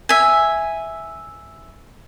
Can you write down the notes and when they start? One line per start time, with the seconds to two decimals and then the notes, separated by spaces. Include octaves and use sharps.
0.09 E5 G#5